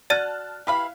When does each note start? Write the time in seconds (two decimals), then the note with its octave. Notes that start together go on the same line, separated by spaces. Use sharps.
0.10 F#4 D5 A5 F6 F#6 A6 D#7
0.67 E4 G4 B4 F5 B5